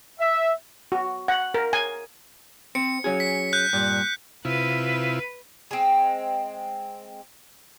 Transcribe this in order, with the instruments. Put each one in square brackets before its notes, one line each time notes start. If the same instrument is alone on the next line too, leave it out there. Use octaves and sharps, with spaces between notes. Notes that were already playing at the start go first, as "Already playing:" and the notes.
[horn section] E5
[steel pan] F#4
F#5
A#4
G#5
[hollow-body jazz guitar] C4 [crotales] C#7
[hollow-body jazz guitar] F#3 C#4 G#4
[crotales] B6
F#6 G6
[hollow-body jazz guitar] G2 A#2
[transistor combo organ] C3 E4 F4 [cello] B4
[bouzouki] G#3 C4